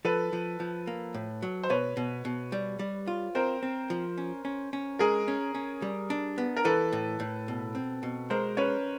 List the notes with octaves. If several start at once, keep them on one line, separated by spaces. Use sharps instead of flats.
F3 A4 B4
F3
F3
A#3
A2
F#3
C5
B2 B4 C#5
B2
B2
G3
G3
F4
C4 A#4 C5
C4
F3
C#4
C#4
C#4
G#3 G#4 A#4
C#4
C#4
G3
D4
B3
A#4
E3 A4 B4
A2
A2
B2
C4
B2
G#3 A#4 C5
C#4 B4 C#5